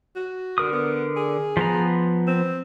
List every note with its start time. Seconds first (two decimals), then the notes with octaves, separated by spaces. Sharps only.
0.16 F#4
0.58 D3 A#4 D#6
0.73 B3
1.17 G#4
1.57 F3 B3 A#5
2.27 C4